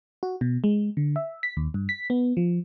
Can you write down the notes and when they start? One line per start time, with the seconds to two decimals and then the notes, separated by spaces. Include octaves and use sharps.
0.23 F#4
0.41 B2
0.64 G#3
0.97 D3
1.16 E5
1.43 B6
1.57 D#2
1.74 G2
1.89 B6
2.10 B3
2.37 F3